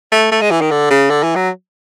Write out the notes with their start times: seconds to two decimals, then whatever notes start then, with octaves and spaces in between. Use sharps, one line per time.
0.12 A3
0.32 A3
0.41 G#3
0.51 E3
0.61 D#3
0.71 D3
0.91 C#3
1.10 D3
1.23 E3
1.36 F#3